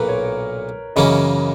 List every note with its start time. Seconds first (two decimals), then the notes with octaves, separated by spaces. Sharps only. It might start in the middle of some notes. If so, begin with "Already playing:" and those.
Already playing: B1 A#2 A#3 A#4 B4
0.09 C#5
0.96 F#2 C#3 E3 A#3 C#4 D#5